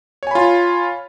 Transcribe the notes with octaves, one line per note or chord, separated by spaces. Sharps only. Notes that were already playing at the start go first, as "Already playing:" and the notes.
F4 C#5 G#5 B5